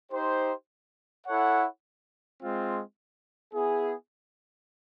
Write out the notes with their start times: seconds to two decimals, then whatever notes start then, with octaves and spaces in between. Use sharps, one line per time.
0.12 D#4 G4 C5
1.26 E4 A4 C#5 F#5
2.40 G#3 C4 F4
3.53 B3 E4 G#4